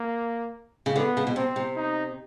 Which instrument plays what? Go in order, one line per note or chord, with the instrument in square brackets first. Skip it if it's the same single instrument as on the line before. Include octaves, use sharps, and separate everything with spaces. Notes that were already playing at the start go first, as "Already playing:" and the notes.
Already playing: [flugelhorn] A#3
[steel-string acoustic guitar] C#3
[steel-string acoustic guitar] D3 [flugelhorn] B3
[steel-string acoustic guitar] C#3
B2
[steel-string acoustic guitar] C3 [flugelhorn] C4
[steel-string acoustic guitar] C3
[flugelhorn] D#4